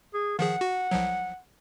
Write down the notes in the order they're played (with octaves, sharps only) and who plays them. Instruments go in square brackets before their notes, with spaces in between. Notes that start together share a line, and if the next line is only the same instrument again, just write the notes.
[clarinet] G#4
[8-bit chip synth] D#3 F3 G#4 [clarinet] F#5
[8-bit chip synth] F#4
C2 F3 F#3